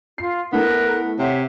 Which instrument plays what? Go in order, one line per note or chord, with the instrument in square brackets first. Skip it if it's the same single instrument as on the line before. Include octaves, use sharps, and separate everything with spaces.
[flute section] F4 [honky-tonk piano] C7
[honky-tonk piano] A3 E4 [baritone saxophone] B3 [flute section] A#4 F#6
[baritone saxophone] C3 [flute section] C#5 E5 F#5